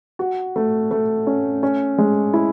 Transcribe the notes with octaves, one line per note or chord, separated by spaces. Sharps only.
F#4
A3
A3
C#4
C#4
G#3
E4